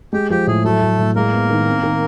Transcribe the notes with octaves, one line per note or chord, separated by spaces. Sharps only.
G#3 G4
F3 G4
A2 G#4
F#3 A3 A4
F#3
A2
G#3 A#3 A#4
B3
D#3
C4
D#3